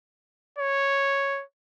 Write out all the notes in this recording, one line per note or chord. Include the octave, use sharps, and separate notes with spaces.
C#5